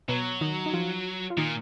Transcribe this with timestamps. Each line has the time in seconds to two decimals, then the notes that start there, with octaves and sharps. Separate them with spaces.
0.08 B2 F#3 B3
0.41 D#3 D#4
0.66 D#4
0.73 F3 F4
1.30 F4
1.37 A#2 D#3 D#4